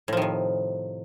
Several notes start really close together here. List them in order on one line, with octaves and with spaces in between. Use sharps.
A2 F3 D#3 C3